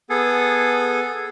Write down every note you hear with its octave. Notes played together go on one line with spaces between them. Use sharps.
B3 G#4 A4